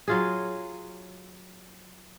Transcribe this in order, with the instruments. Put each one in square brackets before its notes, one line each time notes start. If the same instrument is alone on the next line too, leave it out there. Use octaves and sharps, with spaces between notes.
[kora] F#3 F4 G#4